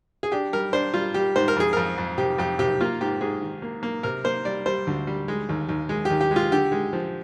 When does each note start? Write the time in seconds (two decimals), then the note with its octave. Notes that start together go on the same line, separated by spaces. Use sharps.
0.23 G#4
0.32 D4 G4
0.53 G3 A#4
0.73 D4 C5
0.94 G3 F4
1.14 G3 G4
1.35 G#2 C5
1.48 A#4
1.57 F2 G#4
1.73 F2 A#4
1.98 F2
2.18 C3 G4
2.38 F2 G4
2.59 C3 G4
2.81 A#3 F4
3.01 G#2 G4
3.21 G#2 G#4
3.41 D#3
3.62 A#3
3.83 A#3
4.03 C3 A#4
4.24 A#3 C5
4.45 G3 D5
4.66 G3 C5
4.87 D2
5.07 G3
5.28 G#3
5.49 D#2
5.69 D#2
5.89 G#3
6.05 D#2 G4
6.21 G4
6.31 G#3
6.36 F4
6.52 D3 G4
6.72 G#3
6.93 F3